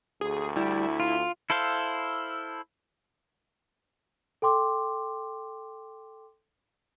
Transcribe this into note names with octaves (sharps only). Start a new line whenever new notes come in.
D2 G#4
G3 E4
F4
E4 A4 C5 F5
A4 G5 C6 D6